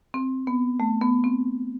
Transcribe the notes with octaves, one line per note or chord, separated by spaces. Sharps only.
C4
B3
A3
B3
C4